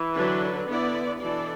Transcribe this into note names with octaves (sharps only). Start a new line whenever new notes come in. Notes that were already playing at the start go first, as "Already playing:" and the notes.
Already playing: E3
D3 F#3 D4 B4
D3 B3 E4 D5
B2 E3 D4 A4 D5